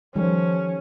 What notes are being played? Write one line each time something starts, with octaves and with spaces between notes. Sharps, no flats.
D#3 F3 G3 C#4 A4